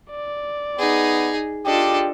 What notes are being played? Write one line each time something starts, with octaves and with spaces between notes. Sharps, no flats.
D5
B3 D#4 G#4
D4 F4 G4 A4 D#5